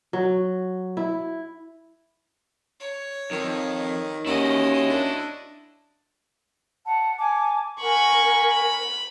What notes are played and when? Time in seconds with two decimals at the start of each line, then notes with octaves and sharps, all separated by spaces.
0.13 F#3
0.97 E4
2.80 C#5
3.31 F2 D#3
4.26 D#2 C#4 E4 F#4 D#5
4.90 D4
6.85 F#5 A5
7.19 G#5 A5 D6
7.82 A#4 F#5 G#5 B5 C#6
8.50 B5